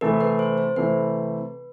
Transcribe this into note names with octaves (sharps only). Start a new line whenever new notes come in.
C3 E3 A3 C4 E4 A#4
B4
C5
C5
C3 E3 A3 C4 E4 B4